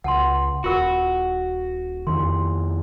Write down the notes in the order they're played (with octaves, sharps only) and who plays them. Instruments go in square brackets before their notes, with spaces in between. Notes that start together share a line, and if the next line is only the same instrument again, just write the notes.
[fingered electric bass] C#2 [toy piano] F#5 A5 C6
[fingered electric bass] D#1 [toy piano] F4 A#4 C#6 [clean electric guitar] F#4
[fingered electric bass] F2 D#3 [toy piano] C6